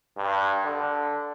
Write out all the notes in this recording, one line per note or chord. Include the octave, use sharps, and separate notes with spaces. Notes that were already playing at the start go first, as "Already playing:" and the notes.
G2
D3